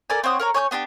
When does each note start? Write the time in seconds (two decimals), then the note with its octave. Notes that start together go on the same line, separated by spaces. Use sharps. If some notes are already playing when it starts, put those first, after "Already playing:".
0.10 A4 A#4 D5 G#5
0.24 C4 C#5 F#5 D#6
0.40 A#4 C#5 A#5
0.54 C#5 G#5 D#6 G6
0.71 B3 D4 E4 G4